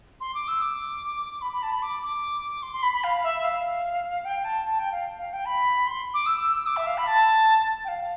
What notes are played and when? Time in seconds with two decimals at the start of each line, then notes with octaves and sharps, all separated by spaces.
0.20 C6
0.34 D6
0.48 E6
0.61 D6
1.41 B5
1.52 B5
1.63 A5
1.72 B5
1.82 D6
2.02 D6
2.62 C6
2.73 C6
2.83 B5
2.93 B5
3.04 F5
3.23 E5
3.44 F5
4.25 G5
4.44 A5
4.65 A5
4.79 G5
4.92 F5
5.19 F5
5.33 G5
5.45 B5
5.87 C6
6.14 D6
6.26 E6
6.47 E6
6.66 D6
6.77 E5
6.87 F5
6.98 B5
7.07 A5
7.84 G5
7.88 F5